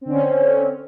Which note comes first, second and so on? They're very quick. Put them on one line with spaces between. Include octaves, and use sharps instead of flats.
C4 D3 C#4